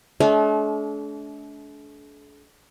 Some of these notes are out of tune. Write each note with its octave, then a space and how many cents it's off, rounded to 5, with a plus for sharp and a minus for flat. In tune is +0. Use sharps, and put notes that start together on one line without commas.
A3 -45 D4 -35